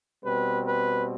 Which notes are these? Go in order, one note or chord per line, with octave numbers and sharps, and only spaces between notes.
B2 G3 C4 B4
B4